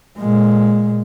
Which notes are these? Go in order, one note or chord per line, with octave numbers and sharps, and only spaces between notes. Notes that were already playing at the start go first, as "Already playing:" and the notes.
A#2 G#3